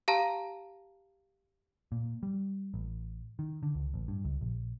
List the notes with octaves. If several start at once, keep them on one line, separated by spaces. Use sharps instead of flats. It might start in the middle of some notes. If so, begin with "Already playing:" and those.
G4 F5 A5 A#5 D#7
A#2
G3
A1
D#3
D3
C#2
A1
G2
C#2
A#1